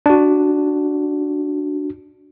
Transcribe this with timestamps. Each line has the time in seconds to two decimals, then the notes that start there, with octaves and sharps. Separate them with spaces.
0.06 D4 F#4